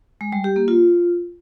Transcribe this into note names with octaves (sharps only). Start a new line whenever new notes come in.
G#3
G3
G4
A#3
F4